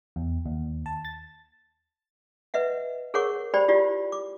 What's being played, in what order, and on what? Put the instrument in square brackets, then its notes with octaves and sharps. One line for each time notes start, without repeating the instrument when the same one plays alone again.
[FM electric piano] E2
D#2
A5
A6
[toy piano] B4 D#5 E5 F#5
G#4 A#4 C#5 F#5 C#6 D6
G4 C5 D5 G5 B5
E4 F4 G4 D5
D6